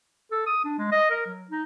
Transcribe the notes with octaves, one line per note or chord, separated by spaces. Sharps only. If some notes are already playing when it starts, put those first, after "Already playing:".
A4
D#6
D4
G#3
D#5
A#4
F#3
D#4